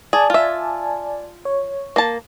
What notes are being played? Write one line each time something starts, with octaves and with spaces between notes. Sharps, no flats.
G#4 D5 G#5 A5
F4 E5
C#5
A#3 A5